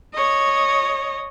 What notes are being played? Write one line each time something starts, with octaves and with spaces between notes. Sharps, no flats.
C#5 D#5